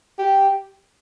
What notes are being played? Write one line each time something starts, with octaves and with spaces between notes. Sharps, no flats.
G4